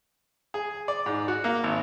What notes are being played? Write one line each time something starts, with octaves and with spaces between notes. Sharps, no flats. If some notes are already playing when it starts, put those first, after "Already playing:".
G#4
D5
G#2
F#4
A#3
G#1